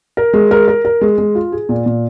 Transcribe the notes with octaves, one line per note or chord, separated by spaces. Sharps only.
A#4
G#3
A#4
A#4
A#4
G#3
G#3
F4
G#4
A#2
A#2